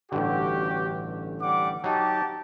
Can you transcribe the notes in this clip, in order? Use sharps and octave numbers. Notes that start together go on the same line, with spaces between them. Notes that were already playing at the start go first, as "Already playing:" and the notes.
A1 G2 D3 F#4 G4
G3 F#5 D6
F#3 D#4 G4 A5